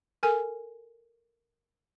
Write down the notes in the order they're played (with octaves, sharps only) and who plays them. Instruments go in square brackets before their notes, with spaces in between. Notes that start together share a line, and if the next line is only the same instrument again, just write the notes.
[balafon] A4 A#4 G#5